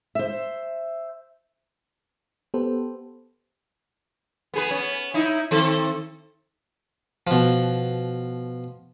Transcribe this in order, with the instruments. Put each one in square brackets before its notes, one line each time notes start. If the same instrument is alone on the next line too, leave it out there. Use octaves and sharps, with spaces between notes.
[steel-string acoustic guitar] C5 E5
[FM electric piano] B3 G4 A4 B4 C5
[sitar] B3 G#4 B4
B3 C#4
D#4 E4
D#3 C4 A4
[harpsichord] B2 F3